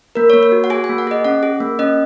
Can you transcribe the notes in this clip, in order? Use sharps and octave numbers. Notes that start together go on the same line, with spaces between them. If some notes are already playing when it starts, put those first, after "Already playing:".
A#3 A#4
A#3 C#5
C#5
F#4
F#5
G#4 G#5
G#5
A#3
F#5
G#4 D#5
C#4 F#5
G#4
A#3
C#4 D#5